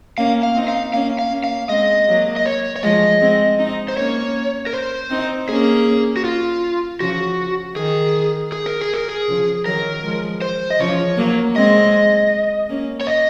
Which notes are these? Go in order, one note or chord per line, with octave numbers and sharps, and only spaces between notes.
A#3 C#4 F5
F5
C4 D#4
F5
A#3 C#4 F5
F5
A#3 C#4
F5
G#3 C4 D#5
F#3 A#3
D#5
C#5
C#5
F3 G#3 D#5
G#3 C4
C4 D#4
C5
A#3 C#4 C#5
A#4
C5
C4 D#4
A#3 C#4 G#4
F#4
F4
C#3 F3 F#4
D#3 G#4
G#4
A#4
G#4
A#4
G#4
C#3 F3
D#3 F#3 A#4
F3 G#3
C5
D#5
C#3 F3 C#5
F#3 A#3
G#3 C4 D#5
A#3 C#4
C#5
D#5